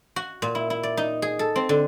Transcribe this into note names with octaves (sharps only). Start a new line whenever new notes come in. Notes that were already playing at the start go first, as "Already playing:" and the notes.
F#4
A#2
E4
E4
D5
D#4
G#4
A4
C4
D3